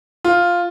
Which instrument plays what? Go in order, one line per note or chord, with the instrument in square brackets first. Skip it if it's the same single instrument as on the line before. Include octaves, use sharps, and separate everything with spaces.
[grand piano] F4